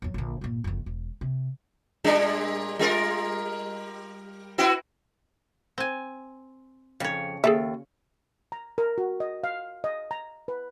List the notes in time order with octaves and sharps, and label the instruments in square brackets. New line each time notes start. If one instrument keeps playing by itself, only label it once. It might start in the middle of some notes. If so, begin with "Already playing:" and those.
[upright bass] E2 F#3
A#1 D3
G1 A#2
F#1 F2
E1
C3
[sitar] A#2 G3 D4
G3 F4 A#4
B3 E4 F#4
[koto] C4 G#5
[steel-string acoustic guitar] F2 [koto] C#3 C#5
[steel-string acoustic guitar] D#2 [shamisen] G#4 A4 E5
[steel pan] A#5
A#4
F#4
D#5
F5
D#5
A#5
B4